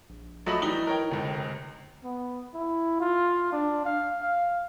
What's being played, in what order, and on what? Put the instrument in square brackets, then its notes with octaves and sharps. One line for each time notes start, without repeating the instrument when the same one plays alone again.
[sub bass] A#1
[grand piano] F3 F#3 A3 [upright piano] D#5 B5 F#7
[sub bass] D1 [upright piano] E3 D#4 G7 [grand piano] G3
[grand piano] A#4 C#5 G5
[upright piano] F1 C#2 [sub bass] D3
[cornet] B3
E4
F4
D4
F5
F5